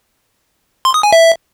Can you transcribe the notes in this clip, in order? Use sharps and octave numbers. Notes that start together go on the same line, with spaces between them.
C6
D#6
G#5
E5